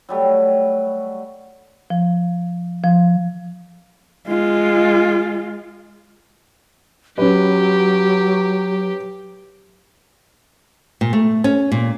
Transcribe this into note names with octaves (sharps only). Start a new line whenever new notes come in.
F#3 G3 A3
F3
F3
G#3 F4
F#3 C#4 G4 B4
A#2
A3
C#4
A#2